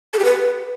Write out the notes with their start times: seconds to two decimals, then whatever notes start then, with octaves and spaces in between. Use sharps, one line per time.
0.14 A4
0.19 G4
0.25 B4